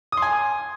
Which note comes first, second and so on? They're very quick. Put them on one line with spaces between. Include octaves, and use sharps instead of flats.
D#6 C6 G#5